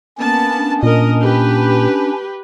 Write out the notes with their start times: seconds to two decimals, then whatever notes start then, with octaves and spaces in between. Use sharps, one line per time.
0.18 A#3 B3 C#4 A5
0.53 C#4 D4
0.83 A#2 A#4 D#5
1.21 G4 B4